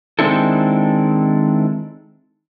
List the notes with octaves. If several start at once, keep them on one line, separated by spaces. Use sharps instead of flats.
D#3 G#3 C4 D4 E4 A4